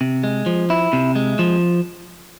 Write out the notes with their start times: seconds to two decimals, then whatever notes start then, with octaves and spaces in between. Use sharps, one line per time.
0.01 C3
0.24 G#3
0.46 F3
0.70 E4
0.93 C3
1.15 G#3
1.39 F3